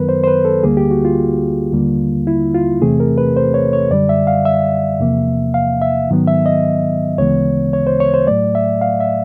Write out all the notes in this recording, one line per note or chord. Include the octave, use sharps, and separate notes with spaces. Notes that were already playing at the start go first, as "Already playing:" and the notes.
Already playing: F#2 D#3 F#3 B3 A#4 B4
C5
C5
B4
A4
D2 D3 G3 A#3 G#4
G4
F#4
F4
D#2 D3 G3 A#3
E4
F4
E2 C3 E3 A3 C4 G#4
A#4
B4
C5
C#5
C#5
F#2 D3 G3 D5
E5
F5
E5
E2 C3 F3 A#3
F5
E5
G#2 D#3 F#3 B3
E5
D#5
D2 C#3 E3 G#3 B3 C#5
C#5
C5
C#5
C5
A2 F#3 A3 D5
E5
F5
E5